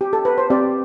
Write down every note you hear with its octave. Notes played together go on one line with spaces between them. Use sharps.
G4
A4
B4
C5
C4 G4 D5